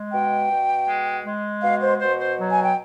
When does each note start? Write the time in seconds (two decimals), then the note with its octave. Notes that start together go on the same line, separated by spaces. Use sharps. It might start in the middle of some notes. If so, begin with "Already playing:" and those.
Already playing: G#3
0.12 B2 G5
0.49 B2
0.88 G#3
1.25 G#3
1.63 B2 F5
1.81 C5
2.01 B2 C5
2.20 C5
2.38 F#3
2.52 G#5
2.64 G5